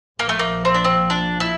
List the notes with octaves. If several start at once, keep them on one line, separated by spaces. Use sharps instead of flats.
A#1 A#2 F3 A#3
A3
A#3
C4
D4
C4
D4
E4